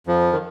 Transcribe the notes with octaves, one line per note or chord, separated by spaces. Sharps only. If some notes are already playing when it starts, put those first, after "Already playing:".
F2 F3
D#3